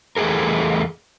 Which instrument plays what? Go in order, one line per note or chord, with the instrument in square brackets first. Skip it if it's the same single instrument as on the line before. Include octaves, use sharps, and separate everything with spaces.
[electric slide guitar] E2 A3 G4 G#4 A#4